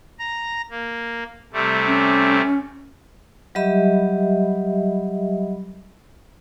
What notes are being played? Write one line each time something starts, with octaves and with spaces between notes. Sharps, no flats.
A#5
A#3
C3 G3 A3
C#4
F#3 G3 G4 D#5 E5 B5